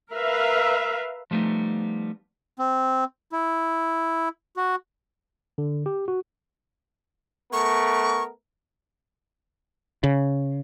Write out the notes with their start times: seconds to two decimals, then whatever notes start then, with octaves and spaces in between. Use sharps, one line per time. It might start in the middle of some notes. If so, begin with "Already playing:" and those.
0.12 A#4 B4 E5 F5
1.31 F3 G3 A3 B3 D#4
2.59 C4
3.32 E4
4.56 F#4
5.58 D3
5.86 G4
6.08 F#4
7.53 A3 B3 A#4 C#6
10.04 C#3